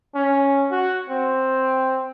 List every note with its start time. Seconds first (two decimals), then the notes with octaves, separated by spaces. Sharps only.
0.15 C#4
0.72 F#4
1.10 C4